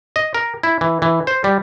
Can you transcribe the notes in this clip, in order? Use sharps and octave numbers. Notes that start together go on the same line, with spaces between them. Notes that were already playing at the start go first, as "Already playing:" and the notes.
D#5
A#4
E4
E3
E3
C5
G3